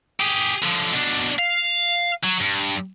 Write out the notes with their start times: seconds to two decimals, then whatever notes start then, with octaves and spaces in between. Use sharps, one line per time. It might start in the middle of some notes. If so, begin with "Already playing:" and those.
0.20 G4 G#4
0.62 D3 F3
0.92 B2 D4
1.39 F5
2.24 F#3
2.41 G2